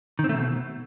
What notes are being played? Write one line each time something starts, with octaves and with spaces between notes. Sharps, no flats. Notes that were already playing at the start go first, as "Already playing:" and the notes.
D#3
C4
A3
B2